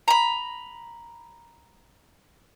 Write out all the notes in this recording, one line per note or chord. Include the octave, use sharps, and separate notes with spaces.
A#5 B5